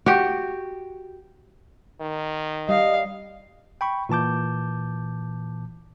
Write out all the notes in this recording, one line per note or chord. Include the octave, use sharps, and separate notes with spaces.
F#4 G4
D#3
G3 D#5 F5
G5 B5 C#6
A#2 E3 A5 D6 G6